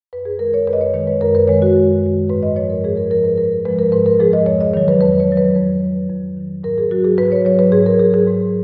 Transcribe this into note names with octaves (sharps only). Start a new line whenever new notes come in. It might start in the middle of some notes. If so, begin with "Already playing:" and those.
F#2 B4
G#4
D#3 G#3 A#4
C#5
F#2 B4
D#5
C#5
D#3 G#3 C#5
B4
F#2 A#4
B4
D#3 G#3 C#5
F#4
F#2
D#3 G#3
G#2 B4
D#5
F3 G#3 C#5
A#4
G#2 G#4
A#4
F3 G#3 A#4
B4
G#2 A#4
F3 G#3 B4
A#4
G#2 B4
A#4
F3 G#3 G#4
D#5
F2 C#5
D#5
D#3 F#3 C#5
B4
F2 B4
C#5
D#3 F#3
B4
F2
D#3 F#3
F2
D#3 F#3
G#2 A#4
G#4
F#3 F#4
G#4
G#2 B4
C#5
F#3 C#5
B4
G#2 G#4
A#4
F#3 G#4
G#4
G#2